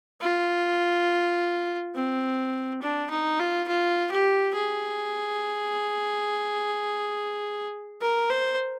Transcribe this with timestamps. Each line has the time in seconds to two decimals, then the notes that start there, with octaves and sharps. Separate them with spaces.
0.21 F4
1.95 C4
2.82 D4
3.10 D#4
3.39 F4
3.68 F4
4.11 G4
4.55 G#4
8.01 A#4
8.30 C5